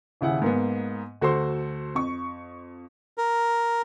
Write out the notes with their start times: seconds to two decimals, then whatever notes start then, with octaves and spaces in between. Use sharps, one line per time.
0.21 D#1 C#3 E4 F#5
0.42 G#2 A#3 B3
1.21 D2 F#4 A4 C5 C6
1.95 F2 C#6
3.18 A#4